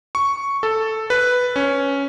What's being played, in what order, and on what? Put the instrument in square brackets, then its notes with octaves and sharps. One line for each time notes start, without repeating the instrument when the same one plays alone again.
[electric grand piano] C#6
A4
B4
C#4